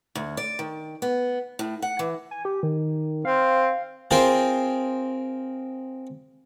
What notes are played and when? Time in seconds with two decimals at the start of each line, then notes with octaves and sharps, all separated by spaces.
0.15 D2
0.37 D5
0.59 D#3
1.02 B3
1.59 A2
1.82 F#5
1.99 E3
2.31 G#5
2.45 G4
2.63 D#3
3.25 C4 F5
4.11 C4 F4 G#4 A#4 C5